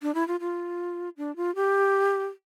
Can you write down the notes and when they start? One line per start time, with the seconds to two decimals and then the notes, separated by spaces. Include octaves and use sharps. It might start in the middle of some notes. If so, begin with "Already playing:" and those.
0.02 D4
0.15 E4
0.28 F4
0.40 F4
1.17 D4
1.36 F4
1.55 G4